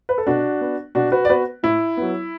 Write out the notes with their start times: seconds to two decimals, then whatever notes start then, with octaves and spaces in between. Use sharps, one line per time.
0.09 B4
0.18 A4
0.27 B2 D4 F#4
0.61 B3
0.95 B2 D4 F#4
1.12 F#4 B4
1.25 D5
1.29 B3 F#4 B4
1.63 A2 E4
1.97 F#3 B3